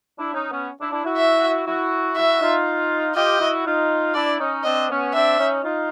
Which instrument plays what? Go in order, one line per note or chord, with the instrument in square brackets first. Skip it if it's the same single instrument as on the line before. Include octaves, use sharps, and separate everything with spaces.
[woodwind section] D4 E4
C#4 D#4
B3 C#4
D4 E4
D4 E4
E4 F#4
[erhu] E5
[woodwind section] E4 F#4
[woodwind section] E4 F#4 [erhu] E5
[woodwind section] D#4 F4
[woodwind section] F4 G4 [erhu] D#5
[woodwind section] E4 F#4
D#4 F4
[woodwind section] D4 E4 [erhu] D5
[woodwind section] C#4 D#4
[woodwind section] C4 D4 [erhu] D#5
[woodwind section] B3 C#4
[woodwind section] C4 D4 [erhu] E5
[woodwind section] C#4 D#4
D#4 F4